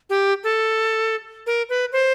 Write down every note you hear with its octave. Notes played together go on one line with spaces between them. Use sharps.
G4
A4
A#4
B4
C5